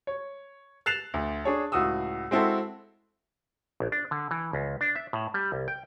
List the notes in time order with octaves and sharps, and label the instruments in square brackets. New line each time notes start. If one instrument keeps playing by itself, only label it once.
[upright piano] C#5
F#6 A6 C7 E7 F7
D2
D4 G#4 C#5 A5
C#2 A2 F#4 D#6 E6
G#3 C4 E4 F#4 A4
[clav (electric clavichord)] A#1
D4
D3
E3
C#2
D4
E5
A2
G3
C2
G5